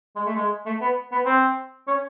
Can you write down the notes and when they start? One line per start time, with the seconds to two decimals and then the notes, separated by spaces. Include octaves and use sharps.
0.16 G#3
0.26 A3
0.35 G#3
0.66 A3
0.82 B3
1.12 B3
1.26 C4
1.87 C#4